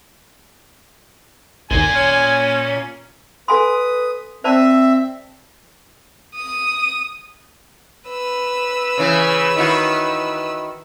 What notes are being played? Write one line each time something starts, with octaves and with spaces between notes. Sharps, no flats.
G#1 D#2 A#2 A#3 G#5
C#4
A4 B4 G#5 C6 D#6
C4 C5 D5 E5 A5
D#6
B4 E6
C#3 E3
D#3 E4 F#4